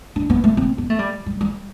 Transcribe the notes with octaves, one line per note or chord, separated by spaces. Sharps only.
D4
B3
A3
C4
B3
A3
G3
G3
G3